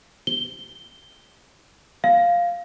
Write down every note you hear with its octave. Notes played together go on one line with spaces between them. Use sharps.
G7
F5